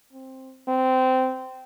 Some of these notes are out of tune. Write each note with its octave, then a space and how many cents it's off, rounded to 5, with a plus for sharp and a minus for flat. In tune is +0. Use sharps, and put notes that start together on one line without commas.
C4 +10
C4 -15